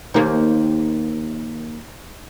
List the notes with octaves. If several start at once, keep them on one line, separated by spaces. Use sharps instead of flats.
D#2 A#3 D#4 G4 C5